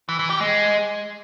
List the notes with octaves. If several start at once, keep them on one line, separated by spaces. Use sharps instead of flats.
E3
E3
G4
G#3